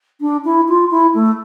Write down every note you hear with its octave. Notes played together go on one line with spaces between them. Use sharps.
D4
E4
F4
E4
A3